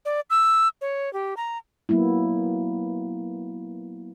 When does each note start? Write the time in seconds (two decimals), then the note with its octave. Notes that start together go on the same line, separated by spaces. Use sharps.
0.05 D5
0.30 E6
0.81 C#5
1.13 G4
1.37 A#5
1.89 F#3 A#3 B3 E4